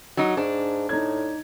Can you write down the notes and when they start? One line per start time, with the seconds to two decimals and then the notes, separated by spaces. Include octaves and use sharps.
0.17 F#3 D#4
0.37 G#2 D4
0.89 A2 D#4 G#6